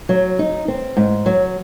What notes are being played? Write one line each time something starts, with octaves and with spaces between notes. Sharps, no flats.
F#3
D#4
C4
G#2
F#3